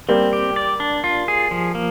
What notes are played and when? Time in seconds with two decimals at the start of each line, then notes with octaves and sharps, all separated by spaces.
0.09 G3 A#3 C4
0.33 G4
0.56 D5
0.80 D4
1.04 F4
1.28 G#4
1.51 F3
1.75 A#3